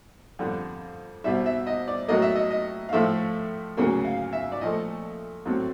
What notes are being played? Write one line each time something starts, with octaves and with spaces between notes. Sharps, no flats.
F2 D3 G3
C2 B2 G3 E5
E5
D#5
D5
A2 F#3 A#3 D#5
E5
D#5
D#5
F5
A2 F3 A3 E5
D2 C#3 F#3 A#3
F5
E5
D5
A#2 F3 A3 D#5
A2 F#3 A3 C4